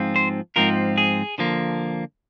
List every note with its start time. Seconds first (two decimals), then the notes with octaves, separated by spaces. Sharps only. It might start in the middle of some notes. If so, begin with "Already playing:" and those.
Already playing: G#2 F3 C4 F4
0.16 C5
0.56 G#2 F3 C4 F4 A#4
0.98 G#4
1.38 D3 F3 A#3